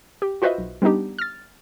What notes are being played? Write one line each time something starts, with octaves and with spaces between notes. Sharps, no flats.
G4
F4 F#4 B4 C5 D#5 E5
B1
G3 B3 D4 D#4 G4
F6 A6